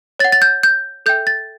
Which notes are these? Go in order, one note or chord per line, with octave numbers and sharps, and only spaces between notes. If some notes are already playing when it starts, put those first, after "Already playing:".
C#5 F#5 A6
A6
G6
G6
A4 E5 G5 G6
A6